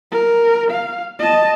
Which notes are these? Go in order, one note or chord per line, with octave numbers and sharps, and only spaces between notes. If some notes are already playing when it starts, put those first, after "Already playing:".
A#4
F5
D#5 A5